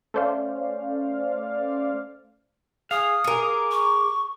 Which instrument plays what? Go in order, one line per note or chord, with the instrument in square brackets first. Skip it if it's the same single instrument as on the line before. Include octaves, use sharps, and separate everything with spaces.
[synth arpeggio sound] A3 C#4 C5 D5 F5
[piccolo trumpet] G#4 [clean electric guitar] F5 [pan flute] D#6
[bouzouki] G#4 A#4 [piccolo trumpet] D6
[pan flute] C#6